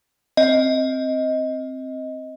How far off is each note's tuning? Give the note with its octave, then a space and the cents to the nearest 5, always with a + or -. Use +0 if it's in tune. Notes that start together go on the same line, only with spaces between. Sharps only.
C4 +5 D#5 +15